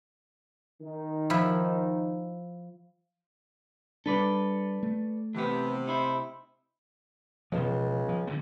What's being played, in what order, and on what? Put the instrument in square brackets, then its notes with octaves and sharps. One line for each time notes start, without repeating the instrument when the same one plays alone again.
[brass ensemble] D#3 D#4
[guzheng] F3 E4 B5
[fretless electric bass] G3 G#3 D4 [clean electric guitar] A4 B4 D5
[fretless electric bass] A3
[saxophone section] C3 [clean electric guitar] E3 B3
[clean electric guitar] D#4 E4 C5
[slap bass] E1 B2 F3 [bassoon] C#2
[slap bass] F3
G2 D3 B3